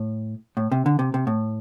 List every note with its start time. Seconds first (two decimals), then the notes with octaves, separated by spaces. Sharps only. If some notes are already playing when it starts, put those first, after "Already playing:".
Already playing: A2
0.57 A2
0.72 C3
0.86 D3
0.99 C3
1.14 C3
1.27 A2